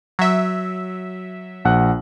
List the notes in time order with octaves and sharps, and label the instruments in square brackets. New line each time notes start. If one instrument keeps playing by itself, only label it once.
[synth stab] F#3 E5
[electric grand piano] A#1 F#5 F#6